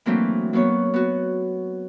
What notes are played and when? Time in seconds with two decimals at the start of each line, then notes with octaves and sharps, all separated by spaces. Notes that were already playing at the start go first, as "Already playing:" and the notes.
0.06 E3 F#3 A3 A#3 C4 D4
0.53 F#3 A#3 B3 C#5
0.94 B3 F#4